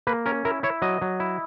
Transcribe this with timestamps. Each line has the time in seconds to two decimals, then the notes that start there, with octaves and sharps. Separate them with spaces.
0.07 A#3 B4
0.26 C#4 A#4
0.45 E4 A#4
0.63 E4 C#5
0.82 F#3 D#5
1.02 F#3
1.20 E4